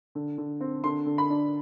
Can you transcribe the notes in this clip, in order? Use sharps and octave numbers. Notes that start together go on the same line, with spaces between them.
D3
D3
C4
D3 C6
D3
B5
D4